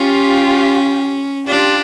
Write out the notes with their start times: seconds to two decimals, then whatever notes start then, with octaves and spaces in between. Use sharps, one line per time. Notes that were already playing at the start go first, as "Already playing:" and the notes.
Already playing: C#4 F4 G4
1.47 D4 F4 G4